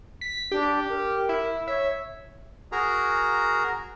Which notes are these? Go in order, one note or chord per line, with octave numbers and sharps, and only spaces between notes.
B6
D4 G4
A#4
E4
C#5 E5
F#4 G#4 A#4 A#5